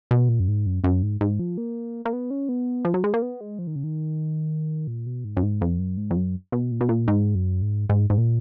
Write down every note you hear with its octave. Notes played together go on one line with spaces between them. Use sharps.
B2
A#2
F#2
G#2
F#2
F#2
G#2
G#2
F3
A#3
A#3
B3
C#4
B3
F3
F#3
G#3
A#3
B3
G#3
F3
D#3
C#3
D#3
A#2
B2
G#2
F#2
G#2
F2
F#2
G#2
F2
F#2
B2
A#2
B2
A#2
G#2
F#2
G#2
G#2
G#2
A#2